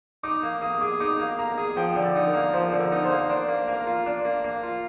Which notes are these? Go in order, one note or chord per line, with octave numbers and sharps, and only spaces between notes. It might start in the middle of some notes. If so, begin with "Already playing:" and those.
D#4 D6
A#3
A#3 D#6
G#4 D6
D#4 D6
A#3
A#3 A#5
G#4
F3 G5
D3
D5
D#4
A#4
A#3
F3 C5
D3
A#4
D#4
C5
A#3
D4 C5
A#3
A#3 A#4
F4
D4
A#3
A#3
F4